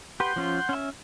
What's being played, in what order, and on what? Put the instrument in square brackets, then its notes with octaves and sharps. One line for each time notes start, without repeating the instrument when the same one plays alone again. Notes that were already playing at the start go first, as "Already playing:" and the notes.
[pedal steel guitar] G4 B4 [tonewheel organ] F#5 C6 G6
[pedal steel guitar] F3 C#4 F4
C#4 E5